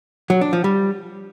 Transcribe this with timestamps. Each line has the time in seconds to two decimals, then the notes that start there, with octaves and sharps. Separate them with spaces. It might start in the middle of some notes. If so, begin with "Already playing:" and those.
0.30 F#3
0.41 D4
0.53 F3
0.64 G3